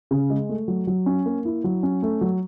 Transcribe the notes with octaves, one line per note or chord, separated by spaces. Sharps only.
C#3
G#3
A3
F#3
F#3
C#4
A#3
E4
F#3
C#4
A3
F#3